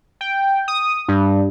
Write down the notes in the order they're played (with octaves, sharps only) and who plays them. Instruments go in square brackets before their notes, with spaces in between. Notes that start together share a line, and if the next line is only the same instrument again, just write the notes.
[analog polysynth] G5
D#6
G2